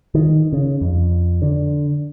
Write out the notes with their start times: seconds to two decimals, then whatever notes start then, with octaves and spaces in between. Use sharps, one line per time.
0.15 D#3
0.53 C#3
0.81 F2
1.42 D3